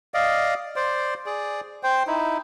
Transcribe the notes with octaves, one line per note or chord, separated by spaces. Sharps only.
D5 D#5 F5
C5 D5
G#4 D5
C5 G5
D#4 E4